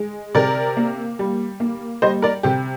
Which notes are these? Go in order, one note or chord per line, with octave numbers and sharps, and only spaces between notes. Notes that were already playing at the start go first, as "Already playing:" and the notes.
Already playing: G#3
C3 A#4 D5
A#3
G3
A#3
G3 C5 D#5
A#4 D5
C3 G4